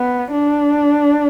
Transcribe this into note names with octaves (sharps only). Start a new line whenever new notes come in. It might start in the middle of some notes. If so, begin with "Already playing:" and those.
Already playing: B3
D4